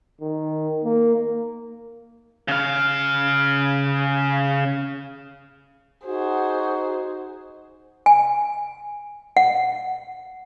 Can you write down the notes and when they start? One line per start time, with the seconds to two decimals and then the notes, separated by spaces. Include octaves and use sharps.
0.21 D#3
0.85 A#3
2.48 C#3 F5
6.06 D#4 F#4 G#4 C5
8.06 G#5
9.37 F#5